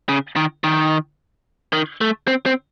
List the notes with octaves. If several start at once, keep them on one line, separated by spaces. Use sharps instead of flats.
C#3
D#3
D#3
D#3
A3
C4
C4